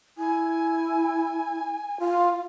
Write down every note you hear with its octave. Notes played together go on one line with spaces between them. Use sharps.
E4 G#5
F4